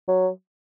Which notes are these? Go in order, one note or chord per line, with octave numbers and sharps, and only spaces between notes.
F#3